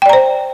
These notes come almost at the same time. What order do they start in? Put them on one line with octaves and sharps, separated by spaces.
G5 D5 A#5 C5